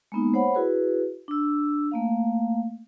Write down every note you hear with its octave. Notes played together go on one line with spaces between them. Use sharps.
G#3 A#3 B3 D#4
C5 C#5 F#5 B5
E4 F#4 G#4 B4
D4 E6
A3 A#3 F5